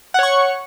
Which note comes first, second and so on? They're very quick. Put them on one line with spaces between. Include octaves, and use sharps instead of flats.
F#5 C#5 C#6